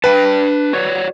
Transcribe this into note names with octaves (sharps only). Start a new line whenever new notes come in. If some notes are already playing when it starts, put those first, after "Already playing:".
D4 B4 G5 A5
F#4 C#5 D5